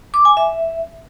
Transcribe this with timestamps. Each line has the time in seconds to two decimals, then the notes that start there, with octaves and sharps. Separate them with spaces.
0.14 D6
0.25 G#5
0.37 E5